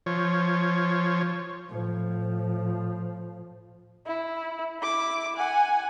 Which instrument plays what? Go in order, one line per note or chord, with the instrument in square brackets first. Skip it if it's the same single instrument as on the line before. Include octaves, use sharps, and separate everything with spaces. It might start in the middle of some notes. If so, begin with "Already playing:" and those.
[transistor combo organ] F3 C#5
[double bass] A2 F3
[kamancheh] E4
E4 D6
F#5 G#5